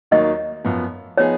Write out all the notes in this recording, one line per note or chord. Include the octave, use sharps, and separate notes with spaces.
D#2 D#3 F#3 A#3 D#4 D#5
F#2 F3 B3
F3 B3 D#4 G#4 C#5